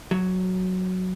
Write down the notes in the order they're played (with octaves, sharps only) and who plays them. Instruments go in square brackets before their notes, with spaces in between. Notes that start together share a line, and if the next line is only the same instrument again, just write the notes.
[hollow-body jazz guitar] F#3